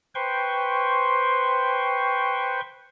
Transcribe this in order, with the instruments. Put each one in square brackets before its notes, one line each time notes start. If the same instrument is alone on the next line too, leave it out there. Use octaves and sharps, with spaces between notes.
[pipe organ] B4 C5 G5 C6 C#6